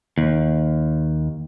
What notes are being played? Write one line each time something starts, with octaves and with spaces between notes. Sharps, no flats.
D#2